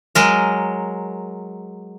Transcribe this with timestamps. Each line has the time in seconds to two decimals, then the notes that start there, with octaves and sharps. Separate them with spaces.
0.15 F#3 G#3 A#4